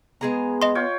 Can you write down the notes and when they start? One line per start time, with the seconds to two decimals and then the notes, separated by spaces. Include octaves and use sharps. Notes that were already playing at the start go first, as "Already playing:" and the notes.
0.21 G#3 B3 G#4 A#5
0.62 D#5 C6
0.75 F4 C#5 G5